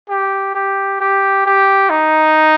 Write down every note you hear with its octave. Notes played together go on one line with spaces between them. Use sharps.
G4
G4
G4
G4
D#4